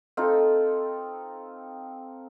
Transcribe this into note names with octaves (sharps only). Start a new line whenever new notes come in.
C4 D#4 F4 A4